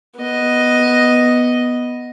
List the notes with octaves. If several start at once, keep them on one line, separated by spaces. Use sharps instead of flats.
B3 D#5